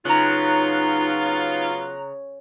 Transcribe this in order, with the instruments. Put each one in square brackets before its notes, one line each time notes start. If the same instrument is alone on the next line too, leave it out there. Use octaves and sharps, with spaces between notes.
[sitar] C#3 [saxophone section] F#3 B3 F4 [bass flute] D#4 [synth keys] A#5 F#6